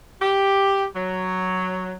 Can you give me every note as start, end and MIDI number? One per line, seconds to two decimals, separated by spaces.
0.22 0.86 67
0.96 1.95 54